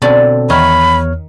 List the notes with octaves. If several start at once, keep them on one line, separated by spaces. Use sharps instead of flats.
B2 D3 C4 C#4 A4 D5
E2 D#3 C#5 B5 F6